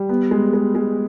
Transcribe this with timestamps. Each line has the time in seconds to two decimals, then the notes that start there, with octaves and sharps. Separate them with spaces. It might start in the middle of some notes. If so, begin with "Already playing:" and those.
Already playing: G3
0.09 B3
0.31 G#3
0.53 G#3
0.75 G#3